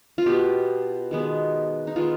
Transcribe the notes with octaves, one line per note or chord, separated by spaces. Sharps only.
F4
B2 B3 G4
D#3 G#3 B3
D#4
D#3 G#3 B3 F4